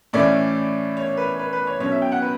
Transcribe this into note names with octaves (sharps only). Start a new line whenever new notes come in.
A2 E3 A3 C#4 D5
C#5
B4
B4
B4
C#5
B2 F#3 C#4 C#5
E5
G5
F#5
B4